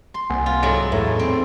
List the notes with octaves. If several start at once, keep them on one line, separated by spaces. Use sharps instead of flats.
C6
C2 A#3 F#5 G#5
F4 F5
G#2 F#3 E4 A4 D#5
E2 A2 B4 E5
C4